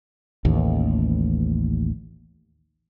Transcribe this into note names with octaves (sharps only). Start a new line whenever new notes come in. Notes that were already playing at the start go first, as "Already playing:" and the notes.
A1 D#2